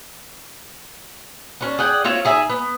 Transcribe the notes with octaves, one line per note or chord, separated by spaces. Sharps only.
C#4 D4
G#4 D5 F#5 G5
A3 C4 F4 C#5
D#4 G#4 E5 G#5
B3